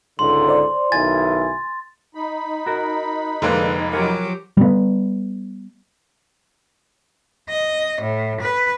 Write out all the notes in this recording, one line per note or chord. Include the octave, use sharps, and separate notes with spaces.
C#2 G#2 D3 C6
C5 D5
B1 D#3 E4 G#5 A6
D#4 B5
F#4 A#4
F1 D3 G#3 A#3 B4
F3 F#3 G4 A#4 F#5 G#5
G3 B3
D#5
A2
B4